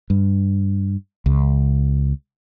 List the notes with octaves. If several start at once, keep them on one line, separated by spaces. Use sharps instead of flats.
G2
C#2